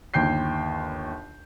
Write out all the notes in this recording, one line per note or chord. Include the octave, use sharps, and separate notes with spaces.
G1 D#2 G5 G6 C7